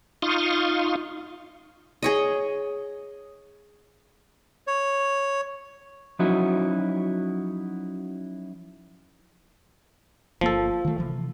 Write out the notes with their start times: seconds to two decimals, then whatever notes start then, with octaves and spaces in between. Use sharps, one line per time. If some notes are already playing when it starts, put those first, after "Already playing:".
0.22 D#4 F4 F5 C6 C#6 D#6
2.03 G#4 C#5 D#5
4.67 C#5
6.19 F3 F#3 C#4 D#4 E4 F#4
10.41 G1 F3 A#3 A4
10.85 D#3 E3 A3
10.98 C3 E3 F3